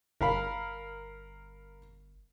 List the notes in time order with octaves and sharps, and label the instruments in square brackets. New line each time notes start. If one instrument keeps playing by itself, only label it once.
[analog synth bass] G1 [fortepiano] A#4 F5 B5